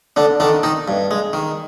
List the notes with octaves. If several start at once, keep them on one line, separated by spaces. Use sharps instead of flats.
D3 D4
D3 D#3 D4
D#3 D#4
G2
G#3
D#3